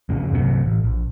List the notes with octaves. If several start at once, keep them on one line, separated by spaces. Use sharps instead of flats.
F2 A#2 C#3
G2 C3 E3 F#3
A1
A#1